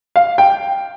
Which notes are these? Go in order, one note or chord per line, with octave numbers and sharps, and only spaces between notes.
F5
G5